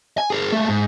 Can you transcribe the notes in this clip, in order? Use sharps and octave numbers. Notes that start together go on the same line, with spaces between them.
G#5
G#4 A#4
G#3 A3
G#2